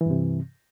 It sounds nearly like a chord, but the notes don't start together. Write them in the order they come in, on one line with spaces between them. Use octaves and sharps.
E3 G2 C3